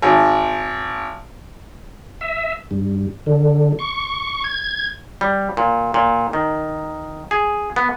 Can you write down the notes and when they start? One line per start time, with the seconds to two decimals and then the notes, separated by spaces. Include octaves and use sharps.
0.02 G#1
2.21 E5
2.71 G2
3.26 D3
3.79 C#6
4.44 G#6
5.21 G3
5.57 A#2
5.94 A#2
6.33 D#3
7.31 G#4
7.76 B3